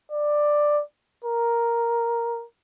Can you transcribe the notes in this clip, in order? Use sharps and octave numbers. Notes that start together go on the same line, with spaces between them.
D5
A#4